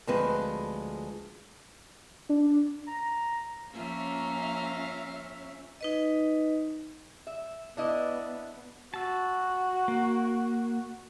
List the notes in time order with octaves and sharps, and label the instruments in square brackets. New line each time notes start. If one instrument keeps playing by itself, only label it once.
[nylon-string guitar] D2 F3 G#3 C4 B4
[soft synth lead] D4
[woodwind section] A#5
[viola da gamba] F3 A#3 F4 [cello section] C#4 E5 [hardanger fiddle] F5 A#5
[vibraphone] D#4 B4 D#5
[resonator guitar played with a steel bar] E5
[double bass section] B3 [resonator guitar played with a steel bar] D4 E4 D#5
[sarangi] F#4 [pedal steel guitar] A5 E6
[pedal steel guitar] A#3